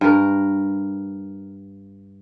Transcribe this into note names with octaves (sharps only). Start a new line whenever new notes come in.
G2 A#4